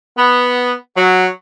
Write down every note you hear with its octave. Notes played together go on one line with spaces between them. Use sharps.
B3
F#3